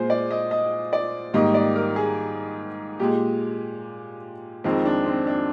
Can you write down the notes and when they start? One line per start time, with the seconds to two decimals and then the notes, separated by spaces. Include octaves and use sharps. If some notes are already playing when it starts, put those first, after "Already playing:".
Already playing: A#2 G#3 G#4 C5
0.10 D5
0.31 D#5
0.51 D#5
0.93 D5
1.34 G#2 D#3 G3 A#3 D#5
1.54 D5
1.75 A#4
1.96 G#4
2.99 A#2 G#3 G4
4.64 F2 D#3 G#3 C4
4.85 D4
5.06 C4
5.27 D4